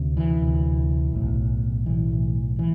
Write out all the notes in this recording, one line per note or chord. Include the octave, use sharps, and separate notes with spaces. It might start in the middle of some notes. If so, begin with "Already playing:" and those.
Already playing: D2 C3
E3
D2 C3
B1 A2
B1 A2 E3
E3